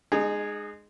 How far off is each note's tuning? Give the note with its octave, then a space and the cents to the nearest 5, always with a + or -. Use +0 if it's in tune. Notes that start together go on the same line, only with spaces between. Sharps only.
G#3 +0 D#4 -30 G#4 +0